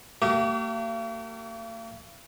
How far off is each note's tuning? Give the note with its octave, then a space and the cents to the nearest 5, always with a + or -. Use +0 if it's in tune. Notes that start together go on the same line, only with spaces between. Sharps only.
A#3 -45 G4 -40